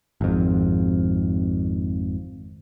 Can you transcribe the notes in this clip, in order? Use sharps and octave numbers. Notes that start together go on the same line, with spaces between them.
G#1 F2